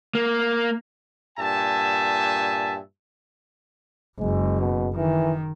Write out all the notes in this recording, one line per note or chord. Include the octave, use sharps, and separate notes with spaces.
A#3
G2 A#2 E5 G#5 A5
F#1 G#3
B2
D#3 E3